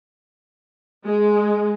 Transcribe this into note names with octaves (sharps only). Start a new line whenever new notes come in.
G#3